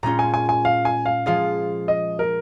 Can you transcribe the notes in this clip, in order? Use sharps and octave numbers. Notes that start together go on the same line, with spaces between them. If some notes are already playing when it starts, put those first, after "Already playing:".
A#2 G#3 C#4 F4 A#5
G#5
G#5
G#5
F5
G#5
F5
F3 G#3 F4 G#4 F5
D#5
A#4